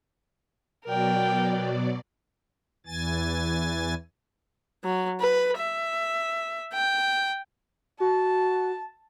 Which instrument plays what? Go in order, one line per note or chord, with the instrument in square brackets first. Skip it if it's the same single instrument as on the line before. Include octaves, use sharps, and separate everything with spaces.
[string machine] B2 F#3 D5 [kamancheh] A#4 G5
[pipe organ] E2 E3 G#5 A6
[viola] F#3
B4
E5
G5
[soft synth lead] F#4 [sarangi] A5